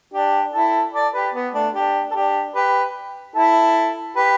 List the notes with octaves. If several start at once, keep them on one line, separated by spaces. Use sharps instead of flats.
D4 G4
E4 A4
A4 D5
G4 B4
B3
A3 D4
D4 G4
A4
D4 G4
G4 B4
E4 A4
G4 B4